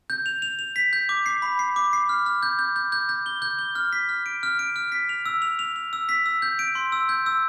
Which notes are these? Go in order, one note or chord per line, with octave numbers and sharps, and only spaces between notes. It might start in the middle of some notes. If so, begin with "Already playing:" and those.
G6
F7
F7
F7
B6
G6
D6
C7
B5
C7
D6
C7
F6
F6
G6
G6
G6
G6
G6
G7
G6
G7
F6
B6
F6
D7
F6
D7
F6
B6
F7
E6
F7
F7
F7
E6
B6
E6
G6
D7
C6
E6
G6
E6